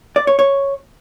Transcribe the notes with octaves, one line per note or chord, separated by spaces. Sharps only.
D5
C#5
C#5